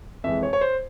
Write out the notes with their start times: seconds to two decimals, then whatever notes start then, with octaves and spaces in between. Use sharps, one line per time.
0.24 F2 E3 G#3 E5
0.43 C#5
0.53 C#5
0.61 C5